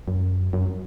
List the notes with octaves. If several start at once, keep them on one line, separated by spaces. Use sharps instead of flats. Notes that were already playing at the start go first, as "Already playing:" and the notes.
F#2
F#2